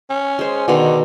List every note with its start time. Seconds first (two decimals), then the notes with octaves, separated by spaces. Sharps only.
0.10 C#4
0.39 G#3 C5
0.68 B2 D3 D#3